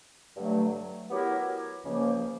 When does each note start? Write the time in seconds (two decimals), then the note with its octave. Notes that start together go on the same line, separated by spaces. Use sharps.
0.35 G2 D3 F#3 A3
1.10 F#3 B3 E4 G4 A#4
1.84 C#2 C#3 F3 A#3